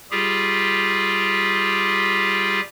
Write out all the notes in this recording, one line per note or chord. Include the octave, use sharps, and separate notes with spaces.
G3 F4 G4 G#4